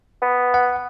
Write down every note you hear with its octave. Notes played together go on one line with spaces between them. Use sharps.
B3
F#5